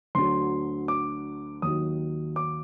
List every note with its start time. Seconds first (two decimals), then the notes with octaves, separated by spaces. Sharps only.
0.15 D2 D3 F#3 C6
0.88 D6
1.62 D#2 D#3 F#3 D#6
2.36 D6